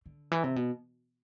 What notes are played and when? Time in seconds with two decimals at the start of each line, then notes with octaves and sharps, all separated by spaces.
0.06 D3
0.31 E3
0.44 C3
0.56 B2